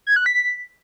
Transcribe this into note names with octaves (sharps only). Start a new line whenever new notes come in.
G#6
F#6
B6